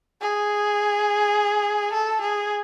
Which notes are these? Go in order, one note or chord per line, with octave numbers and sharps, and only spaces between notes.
G#4
A4
G#4